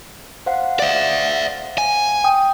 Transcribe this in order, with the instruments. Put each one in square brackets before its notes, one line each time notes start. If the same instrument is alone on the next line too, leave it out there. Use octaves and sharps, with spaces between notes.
[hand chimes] C5 F5 F#5
[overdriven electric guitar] D5 E5
G#5
[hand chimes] G5 D#6